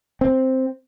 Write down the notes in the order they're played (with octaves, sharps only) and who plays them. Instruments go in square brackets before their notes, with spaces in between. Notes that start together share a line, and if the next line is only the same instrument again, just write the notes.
[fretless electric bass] C4